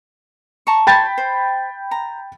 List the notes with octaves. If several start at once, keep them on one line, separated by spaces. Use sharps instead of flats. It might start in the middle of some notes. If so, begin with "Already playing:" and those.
A5 A#5 C#6
C#5 G5 A5 B5 C6 A6
C5
A#5